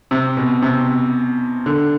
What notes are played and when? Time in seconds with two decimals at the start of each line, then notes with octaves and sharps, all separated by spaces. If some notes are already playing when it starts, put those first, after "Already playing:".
0.11 C3
0.37 B2
0.62 C3
1.66 D3